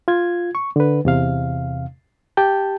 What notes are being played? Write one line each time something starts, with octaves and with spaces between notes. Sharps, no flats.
F4 G#6
C#6
D3 B4
E2 C3 F5
G4 G5 A5 G6